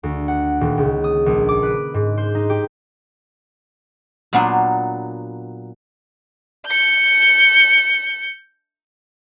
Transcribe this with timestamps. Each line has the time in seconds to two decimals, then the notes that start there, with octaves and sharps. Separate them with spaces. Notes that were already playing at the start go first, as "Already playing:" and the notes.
0.03 D2
0.28 F#5
0.61 D#1
0.78 C#2
1.04 D#6
1.26 A#1
1.49 D6
1.63 B4
1.94 G#2
2.18 C5
2.35 D#4
2.50 G4
4.33 A#2 F#3 A#3 B3 D4
6.66 G6 C#7